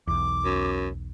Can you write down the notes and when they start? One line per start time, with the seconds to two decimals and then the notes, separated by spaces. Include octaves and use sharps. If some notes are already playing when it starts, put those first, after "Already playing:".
0.07 B1 E2 D6
0.45 F#2